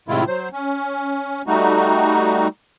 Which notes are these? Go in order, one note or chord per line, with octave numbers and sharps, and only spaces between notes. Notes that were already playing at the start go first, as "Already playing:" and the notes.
A2 C3 D#3 G#3 E4 F4
F#3 C5
C#4
G3 A3 D#4 F#4